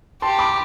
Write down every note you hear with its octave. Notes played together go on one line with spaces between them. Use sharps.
G4 A5 C6
B5 D6